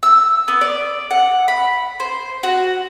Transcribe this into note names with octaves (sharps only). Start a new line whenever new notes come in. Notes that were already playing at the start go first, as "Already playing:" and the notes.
E6
B3
D5
F#5
B5
C5
F#4